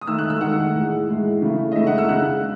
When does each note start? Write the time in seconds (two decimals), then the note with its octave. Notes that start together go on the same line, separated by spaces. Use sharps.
0.01 D#6
0.07 D#3 A3 E6
0.18 F#6
0.30 E6
0.41 D#3 A3 F#5
0.75 A2 E3 G#3
1.08 A2 E3 G#3
1.42 C#3 E3 A3
1.72 D#5
1.75 C#3 E3 A3 E5
1.87 F#5
1.98 E6
2.09 C#3 G#3 F#6